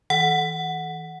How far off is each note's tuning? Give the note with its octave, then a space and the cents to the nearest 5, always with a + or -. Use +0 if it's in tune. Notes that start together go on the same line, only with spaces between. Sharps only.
E3 -30 F#5 +0